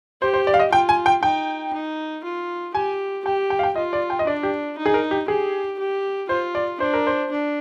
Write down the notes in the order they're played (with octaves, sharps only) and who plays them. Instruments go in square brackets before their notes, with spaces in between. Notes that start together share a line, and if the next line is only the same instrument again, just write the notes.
[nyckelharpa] G4 [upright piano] C5
[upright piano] C5
D5
F5
D#5
[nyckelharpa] F4 [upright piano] G5
[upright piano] G#5
G5
[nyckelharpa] D#4 [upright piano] G5
[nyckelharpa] D#4
F4
[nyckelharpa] G4 [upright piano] G#5
[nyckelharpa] G4 [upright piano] G5
[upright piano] G5
F5
G5
[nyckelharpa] F4 [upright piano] D#5
[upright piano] D5
G5
D#5
[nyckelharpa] D4 [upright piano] D5
[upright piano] G4
[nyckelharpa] D#4
[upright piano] G#4
A#4
G4
[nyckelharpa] G4 [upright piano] G#4
[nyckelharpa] G4
[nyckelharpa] F4 [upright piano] C5
[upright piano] D5
[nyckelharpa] D4 [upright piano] C5
[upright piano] A#4
C5
[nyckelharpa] D4